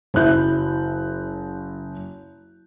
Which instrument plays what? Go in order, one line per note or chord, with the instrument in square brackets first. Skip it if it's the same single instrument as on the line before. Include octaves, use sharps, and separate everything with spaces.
[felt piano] F#1 F#6 G6 [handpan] F#3 E4